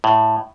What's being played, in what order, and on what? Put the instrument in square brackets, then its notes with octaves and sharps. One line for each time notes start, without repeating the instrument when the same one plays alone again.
[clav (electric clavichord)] A2